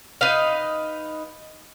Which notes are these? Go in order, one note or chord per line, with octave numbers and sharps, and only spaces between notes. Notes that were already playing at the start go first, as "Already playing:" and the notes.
D#4 B4 F5